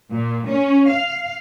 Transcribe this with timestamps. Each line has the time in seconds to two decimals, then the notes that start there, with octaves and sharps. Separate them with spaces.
0.11 A#2
0.47 C#4
0.89 F5